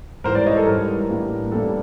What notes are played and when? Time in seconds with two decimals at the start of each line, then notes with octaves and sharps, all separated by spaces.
0.24 G#2 E3 G3 A#4 C5
0.35 C5 D5
0.46 C#5 D#5
0.57 A4
0.67 G#2 E3 G3 A#4
1.09 A2 E3 G3 A#3 D4
1.52 A2 E3 G3 A#3 D4 A4